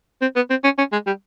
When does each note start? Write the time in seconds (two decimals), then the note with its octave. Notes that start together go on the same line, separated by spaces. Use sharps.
0.22 C4
0.36 B3
0.50 C4
0.64 C#4
0.78 C#4
0.92 G#3
1.07 G3